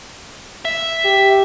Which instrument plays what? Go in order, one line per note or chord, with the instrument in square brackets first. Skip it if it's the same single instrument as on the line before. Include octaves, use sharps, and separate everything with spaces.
[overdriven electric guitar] E5
[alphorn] G4